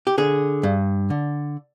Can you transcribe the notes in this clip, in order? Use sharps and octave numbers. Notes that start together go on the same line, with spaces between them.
G4
D3 G#4
G2
D3